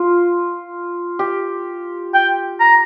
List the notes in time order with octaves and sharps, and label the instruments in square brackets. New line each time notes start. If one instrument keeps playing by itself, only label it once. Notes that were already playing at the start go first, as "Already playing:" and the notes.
Already playing: [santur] F4
G4
[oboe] G5
A#5